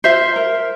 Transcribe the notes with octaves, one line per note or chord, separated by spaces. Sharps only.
F4 C5 E5
A#4